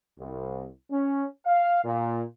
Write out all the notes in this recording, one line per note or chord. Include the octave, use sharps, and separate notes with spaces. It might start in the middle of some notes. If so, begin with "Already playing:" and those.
C2
C#4
F5
A#2